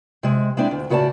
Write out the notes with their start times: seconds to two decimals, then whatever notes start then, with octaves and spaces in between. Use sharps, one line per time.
0.23 C3 G#3
0.57 G#3 C4 D4 E4
0.71 D2
0.89 A2 C#3 F#4 B4 D5 A5